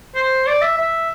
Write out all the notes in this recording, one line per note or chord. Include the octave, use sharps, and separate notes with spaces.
C5
D5
E5
E5